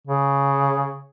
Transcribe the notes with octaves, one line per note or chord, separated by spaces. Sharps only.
C#3